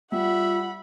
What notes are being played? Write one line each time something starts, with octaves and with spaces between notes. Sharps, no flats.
G3 F4 E5 F#5 B5